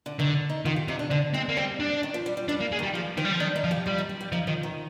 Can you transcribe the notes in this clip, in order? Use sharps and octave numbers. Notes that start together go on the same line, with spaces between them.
D3
D3 D#3
D#4
D#3 F4
G4
C3 D#4
D4
D3 C4
G#3 C4
A#3
G3 C4
D4
D#3
F3
G3
G3
G3 D4
A#3
G#3
D#3 G3
F3 A#3
D#3 C4
G3
F3
D#3 D4
D#4
F3
G4
G3 F4
D#4
G4
G4
F3 D#4
D#3 F3
D#3